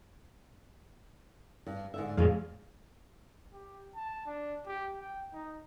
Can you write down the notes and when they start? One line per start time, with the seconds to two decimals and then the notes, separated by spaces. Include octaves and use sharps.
1.67 G2
1.94 G#2 D3 E5
2.17 F2 A2 G#3 G#4 D5 F5
3.53 G4
3.96 A5
4.26 D4
4.66 G4
5.01 G5
5.34 D#4